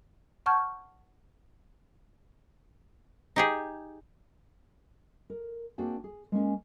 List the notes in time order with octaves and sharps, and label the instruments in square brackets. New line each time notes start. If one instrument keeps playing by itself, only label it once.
[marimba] F#5 A5 C#6 F6 G6 G#6
[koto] D#4 G4 G#4
[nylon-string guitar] A#4
A#3 C4 D4 F#4 G#4 G5
G#4
G#3 A#3 C#4 G#4